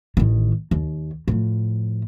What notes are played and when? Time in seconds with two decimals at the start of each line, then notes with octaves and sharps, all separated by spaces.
0.17 A1 D#3
0.71 D#2
1.28 A2 F3